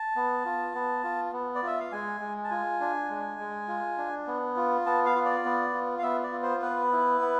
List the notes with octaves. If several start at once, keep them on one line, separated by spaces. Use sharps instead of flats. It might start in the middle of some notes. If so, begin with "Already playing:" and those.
Already playing: A5
B3
F4
B3
F4
B3
D5
F4 E5
F5
G#3 G#5
G#3
A5
F4 G#5
D4
G#3
G#3
F4
D4
B3
F4
B3 A5
F5
F4
D5
B3
F4
F5
B3 E5
D5
F4
C5
B3 B4
E4
B3